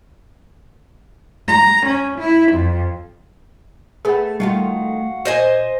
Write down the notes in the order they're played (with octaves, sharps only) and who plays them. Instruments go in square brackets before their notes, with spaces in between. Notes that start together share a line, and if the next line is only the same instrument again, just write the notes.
[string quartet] A#5
C#4
E4
F2
[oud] A3 B3 [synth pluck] G#4 F#5
[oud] D#3 A3 F4 [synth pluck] G3 [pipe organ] F#4 F5 F#5
[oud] A#2 [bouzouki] C5 D#5 G#5